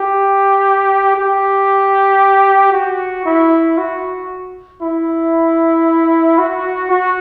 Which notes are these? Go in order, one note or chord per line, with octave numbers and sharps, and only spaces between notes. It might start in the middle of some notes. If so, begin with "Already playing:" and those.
Already playing: G4
G4
F#4
E4
F#4
E4
F#4
F#4